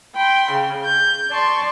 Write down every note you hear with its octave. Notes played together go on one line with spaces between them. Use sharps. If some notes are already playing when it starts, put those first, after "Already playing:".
G5 B5 C6
C#3
G6
D5 A5 C6 C#6